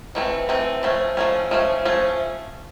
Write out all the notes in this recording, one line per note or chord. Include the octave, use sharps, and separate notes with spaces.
E3 A3 C4
E3 A3 C4
F3 A3 C#4
F3 A3 C#4
F3 A3 C#4
F3 A3 C#4